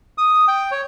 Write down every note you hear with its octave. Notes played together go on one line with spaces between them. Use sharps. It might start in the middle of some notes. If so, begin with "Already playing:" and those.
D#6
G5
C#5